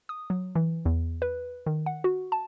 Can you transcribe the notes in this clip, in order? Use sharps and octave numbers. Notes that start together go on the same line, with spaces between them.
D#6
F#3
E3
E2
B4
D#3
F#5
F#4
A5